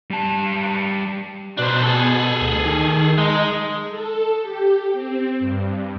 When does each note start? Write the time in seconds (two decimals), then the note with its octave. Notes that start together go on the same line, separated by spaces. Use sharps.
0.11 G3 A5
1.59 B2 D4 C5
1.84 G#4 A4
2.41 D2
2.65 D#3
3.18 G#3 D#4
3.90 A4
4.42 G4
4.93 C4
5.39 G2